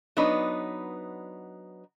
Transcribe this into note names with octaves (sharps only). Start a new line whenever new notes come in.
F#3 B3 D4 D#4 B4 C#5